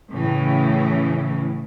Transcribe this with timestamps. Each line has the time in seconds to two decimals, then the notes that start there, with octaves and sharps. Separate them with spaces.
0.11 A2 C#3 E3